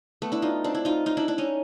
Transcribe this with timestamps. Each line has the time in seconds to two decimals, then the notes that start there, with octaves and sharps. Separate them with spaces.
0.22 A3 B3
0.32 D4 E4
0.42 D#4 F4
0.64 C4 D4
0.74 D4 E4
0.85 D#4 F4
1.06 D#4 F4
1.17 D4 E4
1.28 D4 E4
1.38 C#4 D#4